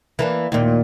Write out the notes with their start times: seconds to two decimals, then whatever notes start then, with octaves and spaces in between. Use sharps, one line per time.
0.19 E3 A#3 D4
0.52 D#2 A#2